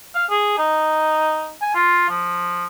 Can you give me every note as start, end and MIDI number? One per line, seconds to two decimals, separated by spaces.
0.15 0.25 77
0.31 0.55 68
0.58 1.52 63
1.62 1.75 80
1.75 2.09 65
2.10 2.66 53